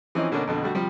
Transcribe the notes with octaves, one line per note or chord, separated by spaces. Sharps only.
E3 F3 C4 C#4 D#4
B2 D3 A#3 C#4 D4
F2 B2 D3
D3 G3 A3 F#4
C3 F3 G3